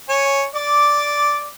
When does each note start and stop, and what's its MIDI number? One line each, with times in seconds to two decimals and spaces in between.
0.09 0.44 73
0.09 0.44 80
0.55 1.49 74
0.55 1.49 86